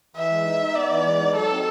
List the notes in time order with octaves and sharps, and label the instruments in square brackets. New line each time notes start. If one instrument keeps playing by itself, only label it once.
[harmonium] E3 [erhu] E5
[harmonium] G#3
D#4
D#4
[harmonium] B3 [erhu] D5
[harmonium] E3
G#3
D#4
[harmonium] F#3 [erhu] A4
[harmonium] C4